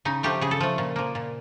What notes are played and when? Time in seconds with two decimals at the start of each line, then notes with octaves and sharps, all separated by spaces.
0.05 C#3 D#4
0.23 F3 A3 G4
0.41 C#3 G#4
0.51 A4
0.60 F3 A3
0.78 A#2
0.96 F3 A#3
1.15 A#2